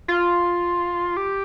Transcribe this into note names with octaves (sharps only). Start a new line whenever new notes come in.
F4
G4